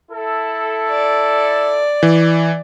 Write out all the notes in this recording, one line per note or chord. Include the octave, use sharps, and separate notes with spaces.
E4 A4
D5
E3